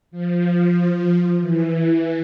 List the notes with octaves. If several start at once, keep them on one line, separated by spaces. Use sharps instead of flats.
F3
E3